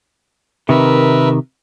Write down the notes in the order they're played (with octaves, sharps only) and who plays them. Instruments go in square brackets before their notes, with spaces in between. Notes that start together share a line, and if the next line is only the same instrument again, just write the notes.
[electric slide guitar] C3 D#3 [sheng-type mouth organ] A#4 B4 E5